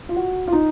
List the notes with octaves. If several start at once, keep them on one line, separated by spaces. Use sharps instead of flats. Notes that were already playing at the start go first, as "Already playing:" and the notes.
F4
F#4
F4
D#4